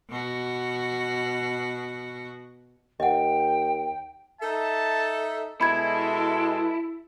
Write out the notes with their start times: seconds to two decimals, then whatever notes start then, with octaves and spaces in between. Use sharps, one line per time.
0.10 B2 F#4
3.00 D#2 D#5 F#5 G5
4.41 D#4 A4 E5 A5
5.61 B2 G#3 E4 A4 B5 G#6